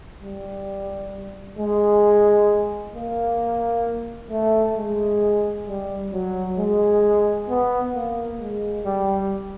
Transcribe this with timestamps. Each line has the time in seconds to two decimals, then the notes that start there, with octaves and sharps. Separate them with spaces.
0.22 G3
1.59 G#3
2.95 A#3
4.31 A3
4.77 G#3
5.67 G3
6.13 F#3
6.58 G#3
7.49 B3
7.95 A#3
8.40 G#3
8.85 G3